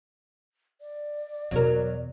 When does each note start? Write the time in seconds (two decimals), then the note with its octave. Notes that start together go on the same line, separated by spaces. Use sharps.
0.81 D5
1.51 E2 B2 F#3 A#4